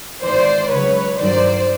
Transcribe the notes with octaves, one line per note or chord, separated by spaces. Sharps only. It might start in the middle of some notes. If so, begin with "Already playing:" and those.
G#1 G#2 E3 C5 D5
C#2 C#3 F#3 B4 C#5
G2 D#3 F#3 C5 D5